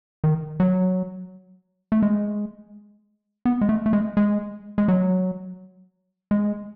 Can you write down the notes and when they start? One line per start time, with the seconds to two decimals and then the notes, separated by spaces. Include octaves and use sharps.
0.24 D#3
0.60 F#3
1.92 A3
2.02 G#3
3.45 B3
3.61 G#3
3.69 A3
3.86 A3
3.93 G#3
4.17 G#3
4.78 G#3
4.88 F#3
6.31 G#3